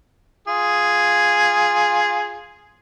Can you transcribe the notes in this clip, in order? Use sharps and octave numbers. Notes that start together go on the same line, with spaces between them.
F4 G#4